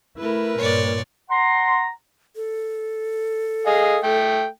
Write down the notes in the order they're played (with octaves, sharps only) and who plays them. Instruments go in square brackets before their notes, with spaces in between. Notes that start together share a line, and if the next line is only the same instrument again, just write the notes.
[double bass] A3 E4 [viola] A#4 B4
[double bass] G2 A#2 [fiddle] C#5 D5
[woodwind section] F#5 A#5 C6
[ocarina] A4
[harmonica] G#4 D#5 F5
A3 G5